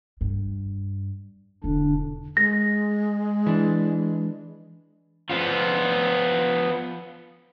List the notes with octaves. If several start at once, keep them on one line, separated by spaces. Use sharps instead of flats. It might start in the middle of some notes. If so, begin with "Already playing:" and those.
G2
E1 D3 D4
G#3 A#6
E3 D4
F3 B3